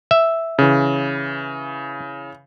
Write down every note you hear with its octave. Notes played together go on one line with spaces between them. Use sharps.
E5
C#3 E3